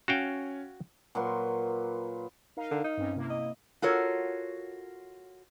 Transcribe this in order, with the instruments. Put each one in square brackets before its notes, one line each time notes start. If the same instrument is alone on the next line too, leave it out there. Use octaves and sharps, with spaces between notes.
[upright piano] C#4 [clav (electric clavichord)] F#4 F5 G5
[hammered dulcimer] A#2 F#3 B4 C6
[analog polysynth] D#4 A#4 F5
[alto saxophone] D3
D#4
[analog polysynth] G2 C4 C#4
C3 A#3 E4
[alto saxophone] D#5
[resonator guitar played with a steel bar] F4 F#4 A4 A#4 C#5